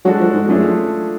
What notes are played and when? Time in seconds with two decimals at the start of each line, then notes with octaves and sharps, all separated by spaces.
0.05 F#3 G#3 D4 F#4 A4
0.20 F3
0.33 G#2
0.47 F#2 F3 A3 D4 G#4